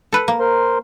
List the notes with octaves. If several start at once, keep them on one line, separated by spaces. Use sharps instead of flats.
A4 B4
A#3
A#4 C5 C6